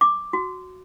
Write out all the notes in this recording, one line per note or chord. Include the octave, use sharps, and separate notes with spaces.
D6
F#4